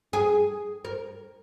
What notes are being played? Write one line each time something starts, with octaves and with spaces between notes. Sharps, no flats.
G#4
A#4